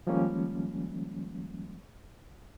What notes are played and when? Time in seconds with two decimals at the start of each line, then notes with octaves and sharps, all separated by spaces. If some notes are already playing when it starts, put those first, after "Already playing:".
0.07 D#3 F3 G3 G#3 A#3 C#4